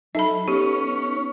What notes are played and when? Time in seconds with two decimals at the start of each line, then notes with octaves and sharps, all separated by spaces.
0.15 F#3 D#4 A4 E5 B5
0.48 B3 C#4 G4